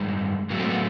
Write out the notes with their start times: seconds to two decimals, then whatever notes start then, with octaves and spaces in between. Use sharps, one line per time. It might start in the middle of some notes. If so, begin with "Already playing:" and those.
Already playing: G2 D#3 G#3
0.50 A2 F#3 A3 A#3
0.59 C4
0.70 B3